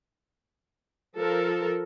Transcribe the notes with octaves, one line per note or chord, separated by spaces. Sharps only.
F3 A4 A#4